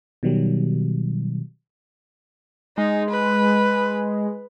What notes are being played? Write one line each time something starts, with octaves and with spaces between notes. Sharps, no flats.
B2 D#3 F#3 G3
G#3 D#4
B4